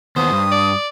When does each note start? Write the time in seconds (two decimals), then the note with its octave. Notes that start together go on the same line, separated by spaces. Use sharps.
0.16 D#2 B3 C5 D#6
0.33 G2
0.52 D5